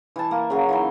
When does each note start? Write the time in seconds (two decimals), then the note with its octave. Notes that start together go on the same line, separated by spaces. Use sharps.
0.16 E3 A5
0.31 A#3
0.50 C#3 F#3
0.69 E3 D#4 C6